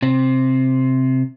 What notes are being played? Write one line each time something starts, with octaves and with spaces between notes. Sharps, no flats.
C3 C4